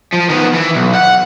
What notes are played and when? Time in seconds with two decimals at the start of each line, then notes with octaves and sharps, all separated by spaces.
0.14 F3
0.30 D#3 B3
0.55 E3
0.75 B1
0.95 F#5